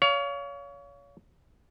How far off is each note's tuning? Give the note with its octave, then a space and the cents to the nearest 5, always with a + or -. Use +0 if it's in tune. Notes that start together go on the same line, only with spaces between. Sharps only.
C#5 +30 F5 +0